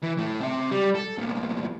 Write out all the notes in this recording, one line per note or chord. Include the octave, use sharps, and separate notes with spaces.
E3
A2 A3
C4 E5
G3
A4
C2 A#2